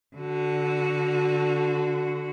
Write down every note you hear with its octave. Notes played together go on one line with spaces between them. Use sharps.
D3 F#4